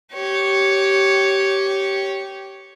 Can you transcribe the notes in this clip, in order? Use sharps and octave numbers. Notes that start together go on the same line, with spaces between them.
G4 C#5